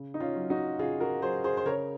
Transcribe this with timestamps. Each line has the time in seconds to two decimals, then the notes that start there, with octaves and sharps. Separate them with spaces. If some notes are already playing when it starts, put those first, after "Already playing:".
Already playing: C#3
0.14 D#4
0.20 C#4 F4
0.35 F#3
0.50 D#4 F#4
0.79 C#3 F4 G#4
1.00 F#4 A#4
1.22 F#3 G#4 C5
1.44 G#4 C5
1.57 C5
1.65 C#3 A#4 C#5